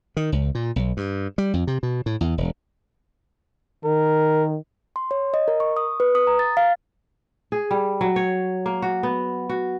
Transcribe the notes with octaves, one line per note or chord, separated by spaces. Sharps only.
D#3
C#2
A#2
B1
G2
G3
F2
C3
B2
A2
E2
E1
D#3 A#4
C6
C#5
D#5
A#4
C#6
D#6
B4
D#6
A#5
A6
F5
G#4
G3
F#3
C#5
A#3
F#4
B3
F#4